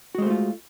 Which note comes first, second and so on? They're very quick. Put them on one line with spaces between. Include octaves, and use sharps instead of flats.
F#4 G#3 C5 A3 F4